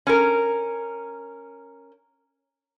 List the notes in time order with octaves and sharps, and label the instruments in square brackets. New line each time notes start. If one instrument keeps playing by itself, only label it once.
[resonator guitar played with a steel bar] C#4 A#4